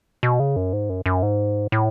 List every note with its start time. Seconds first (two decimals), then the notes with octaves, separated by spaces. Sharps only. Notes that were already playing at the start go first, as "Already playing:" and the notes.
0.23 B2
0.40 C#3
0.56 F#2
0.73 G#2
0.89 F#2
1.06 F#2
1.23 G#2
1.72 A2